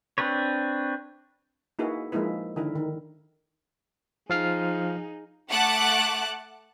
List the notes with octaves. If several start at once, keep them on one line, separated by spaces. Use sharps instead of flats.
C4 D4 B4 C#5
A#3 D#4 E4 F#4 G#4 B4
F3 G#3 A#3 D#4 E4 B4
D3 D#3 E4 A#4
D#3
F3 D#4 G#4 F5 F6
A3 F#5 A5 D6 F#6